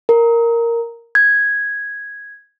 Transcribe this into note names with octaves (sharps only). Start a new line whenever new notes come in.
A#4
G#6